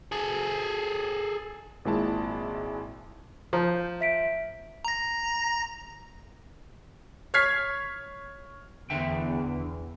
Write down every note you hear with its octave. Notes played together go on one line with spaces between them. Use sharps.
G#4 A4
G#1 A#2 G#3 E4 A5
F3 A#5 G6
E5 B6 D7
A#5 A#6
C#5 F6 G#6 B6 C7
E2 D3 E5 G5